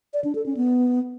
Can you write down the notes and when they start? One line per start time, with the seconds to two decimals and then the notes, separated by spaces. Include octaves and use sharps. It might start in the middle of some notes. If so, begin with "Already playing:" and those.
0.14 D5
0.24 D4
0.35 A4
0.46 C#4
0.57 B3